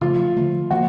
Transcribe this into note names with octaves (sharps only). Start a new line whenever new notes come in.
C#3 F3 A3 F4
D3 F3 A3
F3 A#3 F#4